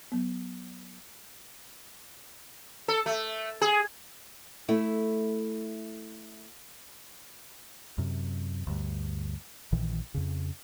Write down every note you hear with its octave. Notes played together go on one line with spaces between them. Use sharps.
F#3 B3
A4
A3
G#4
A3 E4
F#2 C3
D2 G2
A#1 A#2 D#3 E3
F2 C#3